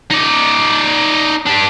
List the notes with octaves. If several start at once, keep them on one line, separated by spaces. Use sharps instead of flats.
D#4 D5
D4 G4